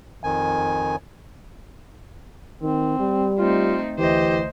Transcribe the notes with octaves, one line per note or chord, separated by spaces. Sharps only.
F2 D#3 G#5
D#3 C4
G3
A3 C4 D#4 F4
D2 E3 G4 C5 D#5